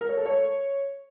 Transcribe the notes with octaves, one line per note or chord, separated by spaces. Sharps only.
A#4
C#5
A4
C#5